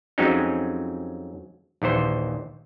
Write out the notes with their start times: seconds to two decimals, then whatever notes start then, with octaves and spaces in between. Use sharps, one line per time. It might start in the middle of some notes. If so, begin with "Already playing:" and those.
0.18 F2 F#3 G#3 C4 C#4 D#4
1.82 A#1 D#2 E3 C5